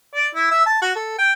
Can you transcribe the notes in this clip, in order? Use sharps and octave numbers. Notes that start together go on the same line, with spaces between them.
D5
E4
E5
A5
F#4
A4
G5